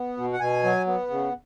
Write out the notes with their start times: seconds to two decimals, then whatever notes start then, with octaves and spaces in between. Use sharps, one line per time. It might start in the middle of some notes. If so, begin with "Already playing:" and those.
Already playing: B3
0.17 B2
0.33 F#5
0.40 B2 G#5
0.63 F#3
0.87 B3
1.10 C#3